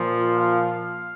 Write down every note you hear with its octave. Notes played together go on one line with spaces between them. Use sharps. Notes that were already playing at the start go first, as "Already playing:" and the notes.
Already playing: A#2 F3
F5